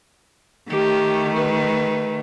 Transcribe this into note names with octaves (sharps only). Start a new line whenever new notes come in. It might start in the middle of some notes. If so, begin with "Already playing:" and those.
D#3 A3 G4
B4